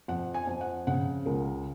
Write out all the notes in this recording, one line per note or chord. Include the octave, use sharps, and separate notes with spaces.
F2 F#5
G#5
F2
F#5
C#3 F#5
C#2 A#4